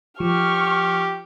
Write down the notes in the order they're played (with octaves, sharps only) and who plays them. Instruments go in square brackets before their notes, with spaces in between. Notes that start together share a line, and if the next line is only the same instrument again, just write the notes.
[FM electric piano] F3 [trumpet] G4 [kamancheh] C#6 F6